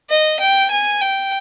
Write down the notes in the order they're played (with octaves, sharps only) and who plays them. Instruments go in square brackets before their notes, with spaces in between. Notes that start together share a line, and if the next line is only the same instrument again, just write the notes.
[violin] D#5
G5
G#5
G5